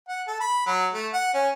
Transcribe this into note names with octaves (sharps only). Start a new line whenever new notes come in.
F#5
A4
B5
F#3
A3
F#5
C#4